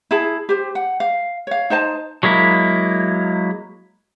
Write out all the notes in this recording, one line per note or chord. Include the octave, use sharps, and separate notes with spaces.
E4 G#4 A5
G4 C5
F#5
F5
C#5 F5
D#4 C5 D#5 A5
F#3 G#3 A#3 E4